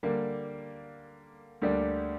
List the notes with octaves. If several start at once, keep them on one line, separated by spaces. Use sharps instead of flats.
D3 G3 A#3
D2 D3 G3 A#3 D4